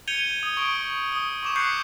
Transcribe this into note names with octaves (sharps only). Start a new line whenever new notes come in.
G6 G#6 C#7 D#7 F7 G7
D#6
C#6 D#6 D7
D#6
C#6 D6 E7
C#6 D6 F#6 G6 C7 C#7